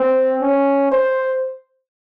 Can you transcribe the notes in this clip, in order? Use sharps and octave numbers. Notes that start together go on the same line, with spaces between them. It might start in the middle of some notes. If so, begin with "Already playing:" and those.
Already playing: C4
C#4
C5